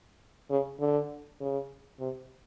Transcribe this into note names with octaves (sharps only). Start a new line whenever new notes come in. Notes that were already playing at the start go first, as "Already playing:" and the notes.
C#3
D3
C#3
C3